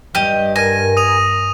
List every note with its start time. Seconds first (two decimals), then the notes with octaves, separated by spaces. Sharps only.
0.15 G2 G4 D#5
0.56 A#4 G#5 A#6 D#7
0.97 D#6 D#7 F7